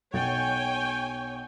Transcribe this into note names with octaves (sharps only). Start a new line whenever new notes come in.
B1 B2 C#5 G5 G#5 A6